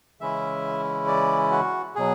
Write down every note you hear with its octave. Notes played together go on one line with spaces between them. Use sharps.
C#3 E3 G#3 C#4 E4 E5
D5
F#4
B2 F#3 G#4